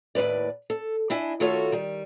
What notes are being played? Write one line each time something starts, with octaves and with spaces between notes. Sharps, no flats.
D#2 A2 G#3 B4 D5
A4
D4 E4 D#5 G#5
D#3 A3 F4 F#4 A4 C#5
D#3 G3